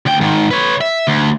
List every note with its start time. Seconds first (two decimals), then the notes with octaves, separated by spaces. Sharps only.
0.06 D2 G5
0.21 G#2 D#3
0.51 B4 C#5
0.81 E5
1.08 D2